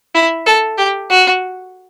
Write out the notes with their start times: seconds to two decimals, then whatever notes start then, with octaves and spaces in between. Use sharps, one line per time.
0.15 E4
0.46 A4
0.78 G4
1.10 F#4